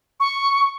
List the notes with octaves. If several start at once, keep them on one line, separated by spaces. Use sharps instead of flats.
C#6